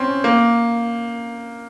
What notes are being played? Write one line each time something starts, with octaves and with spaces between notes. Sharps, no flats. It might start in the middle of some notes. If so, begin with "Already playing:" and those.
Already playing: C4 C#4
A#3